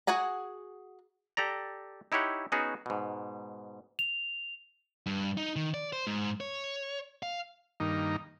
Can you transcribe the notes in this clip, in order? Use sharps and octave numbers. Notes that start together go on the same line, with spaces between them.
F#4 G#4 F#5 G#5 A#5
G4 A4 D5 A#5
D#4 E4 G4 C#5 F#5
B3 C#4 D#4 F#4 G#4
G#2 B2
F7
G2
D#4
D#3
D5
C5
G#2
C#5
F5
G2 D#3 A#3 D#4